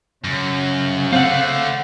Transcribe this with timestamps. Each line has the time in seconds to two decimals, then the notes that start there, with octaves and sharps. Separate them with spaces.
0.24 F#2 C#3
1.13 D3 A3 C4 F5 F#5